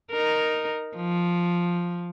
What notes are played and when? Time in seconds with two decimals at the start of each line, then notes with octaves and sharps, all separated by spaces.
0.12 D#4 A#4
0.96 F3